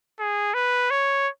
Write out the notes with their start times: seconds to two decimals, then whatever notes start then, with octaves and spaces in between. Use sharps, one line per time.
0.19 G#4
0.54 B4
0.90 C#5